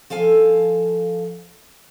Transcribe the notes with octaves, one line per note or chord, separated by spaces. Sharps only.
F3 A4 F5 G#5